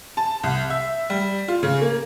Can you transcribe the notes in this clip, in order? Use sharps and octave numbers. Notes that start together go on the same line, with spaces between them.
A5
C2
E5
G3
F4
C#3
A#3